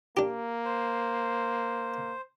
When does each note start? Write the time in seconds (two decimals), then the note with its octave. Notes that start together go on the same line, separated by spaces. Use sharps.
0.17 A#3 D4 G4
0.65 C5